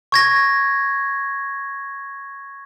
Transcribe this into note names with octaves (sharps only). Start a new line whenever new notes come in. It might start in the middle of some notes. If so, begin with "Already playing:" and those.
C#6 G#6 A#6